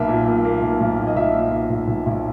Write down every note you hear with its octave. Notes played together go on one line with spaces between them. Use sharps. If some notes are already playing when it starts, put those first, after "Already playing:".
Already playing: B1 A#3 E5
A#2
A#3
A#3
B1
B1
A#2
D#5
B1 E5
A#2
B1
B1
B1
B1